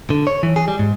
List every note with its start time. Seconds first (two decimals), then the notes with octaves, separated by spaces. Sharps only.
0.10 D3
0.27 C#5
0.43 E3
0.56 G#4
0.68 G3
0.79 G#2